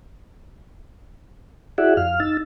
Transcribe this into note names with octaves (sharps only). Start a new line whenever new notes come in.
E4 F#4 G#4 D5 E5 F#5
F2 F5 F6
D#4 E6 A6